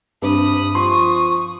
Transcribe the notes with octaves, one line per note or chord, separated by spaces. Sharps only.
G2 C3 B5 D#6
F3 C6 C#6 D#6